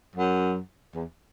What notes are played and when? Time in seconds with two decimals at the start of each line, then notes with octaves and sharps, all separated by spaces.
0.16 F#2
0.94 E2